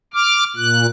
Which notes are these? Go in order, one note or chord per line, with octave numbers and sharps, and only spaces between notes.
D6 F6
A#2 F#6